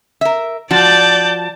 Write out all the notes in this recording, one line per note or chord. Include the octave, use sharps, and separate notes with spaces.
A#4 E5
F3 F#4 D5 A5 G6